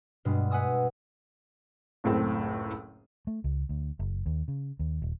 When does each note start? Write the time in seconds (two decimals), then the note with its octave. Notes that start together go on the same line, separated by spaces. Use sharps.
0.25 G2 B2 G3 G#3
0.51 B4 F#5 G#5 D#6 E6
2.04 F#1 C#2 A2 A3 C4
3.27 A3
3.44 C#2
3.69 D2
3.99 F#1
4.26 D#2
4.48 C#3
4.79 D#2
5.02 D#1